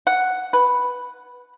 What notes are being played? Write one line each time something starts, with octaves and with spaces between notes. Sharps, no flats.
F#5
B4